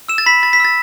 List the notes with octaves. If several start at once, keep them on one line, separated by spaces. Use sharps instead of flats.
E6 E7
A6
B5 B6
B5 A6
B6
E6 A6